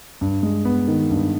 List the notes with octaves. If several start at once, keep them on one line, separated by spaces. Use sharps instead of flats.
G2
G#3
B3
D#3
G2